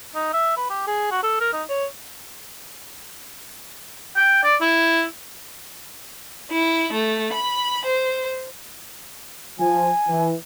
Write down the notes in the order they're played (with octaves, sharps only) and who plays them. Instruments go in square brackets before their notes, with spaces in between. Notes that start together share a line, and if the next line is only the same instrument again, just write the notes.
[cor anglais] D#4
E5
B4
G4
G#4
F#4
A4
A#4
D#4
C#5
[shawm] G5
D5
E4
[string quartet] E4
A3
B5
C5
[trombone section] F3 [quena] G#5
[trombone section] E3